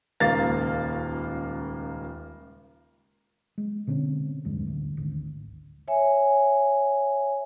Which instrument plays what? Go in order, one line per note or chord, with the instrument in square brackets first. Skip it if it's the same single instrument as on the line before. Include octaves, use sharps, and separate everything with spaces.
[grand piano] D#1 C#2 A#3 F5 A6
[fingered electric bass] G#3
B2 D3 C4 C#4
D1 E2 G2 G#3
A1 D2
G#1 D2
[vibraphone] C#5 E5 G#5